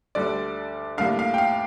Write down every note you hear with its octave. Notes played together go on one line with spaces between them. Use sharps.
D2 D3 G3 D4 D5
A2 G3 A#3 D4 F5
F5
G5
F5